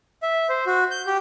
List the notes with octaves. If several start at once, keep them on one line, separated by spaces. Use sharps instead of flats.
E5
C5
F#4
G6
G4